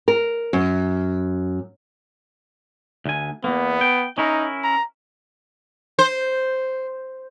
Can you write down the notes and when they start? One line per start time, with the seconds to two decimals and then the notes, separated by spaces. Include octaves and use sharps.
0.08 A#4
0.53 F#2
3.06 D2 G#5
3.44 E2 G#2 A#3 B3
3.81 G5
4.18 C#4 D#4 E4 A#4
4.64 A#5
5.99 C5